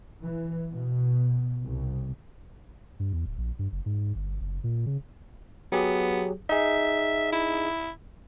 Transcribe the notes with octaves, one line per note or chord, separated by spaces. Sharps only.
E3
B2
C2
G2
E2
D1
A#1
G2
F#1
G#2
G1
F#1
A#2
C#3
F#3 B3 G4 G#4
D#4 G#4 E5
E4